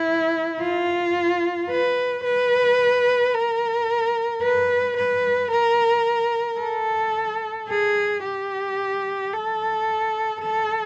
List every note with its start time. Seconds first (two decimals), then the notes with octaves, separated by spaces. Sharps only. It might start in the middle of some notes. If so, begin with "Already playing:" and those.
Already playing: E4
0.61 F4
1.70 B4
2.24 B4
3.34 A#4
4.42 B4
4.97 B4
5.51 A#4
6.60 A4
7.69 G#4
8.24 G4
9.33 A4
10.41 A4